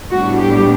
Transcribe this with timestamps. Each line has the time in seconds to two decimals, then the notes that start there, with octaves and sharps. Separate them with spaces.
0.10 A2 G3 B3 D4 F#4
0.39 G4